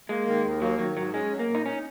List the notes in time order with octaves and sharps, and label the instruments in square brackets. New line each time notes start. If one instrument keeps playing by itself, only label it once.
[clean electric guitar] G#3 [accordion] A#3
[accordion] D#3
D#2
[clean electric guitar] F#3 [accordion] A#3
[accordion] D#3 [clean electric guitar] F#3
[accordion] G#2 [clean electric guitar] F#3
[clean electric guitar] G#3 [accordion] C#4
[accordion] F#3
[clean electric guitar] A#3
[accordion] A#2
[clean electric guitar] D#4
[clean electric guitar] C#4 [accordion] D#4